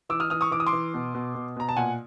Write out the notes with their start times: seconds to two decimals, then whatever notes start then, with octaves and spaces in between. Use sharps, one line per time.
0.09 E3 D6 E6
0.20 D#6 F6
0.30 E3 D#6 F6
0.41 C#6 D#6
0.51 E3 D6
0.60 D#6
0.66 C6 D6
0.73 E3
0.94 B2
1.15 B2
1.35 B2
1.56 B2 A#5
1.69 A5
1.76 A#2 F#5 G#5